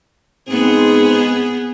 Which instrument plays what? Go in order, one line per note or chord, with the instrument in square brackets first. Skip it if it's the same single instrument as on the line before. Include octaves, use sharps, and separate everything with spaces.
[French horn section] G#2 C4 [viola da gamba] B3 G#4